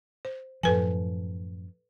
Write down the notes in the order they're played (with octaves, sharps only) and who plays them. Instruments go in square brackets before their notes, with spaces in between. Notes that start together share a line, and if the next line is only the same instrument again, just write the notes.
[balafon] C5
[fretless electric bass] F#2 A2 F3 [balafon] A4 B4 G#5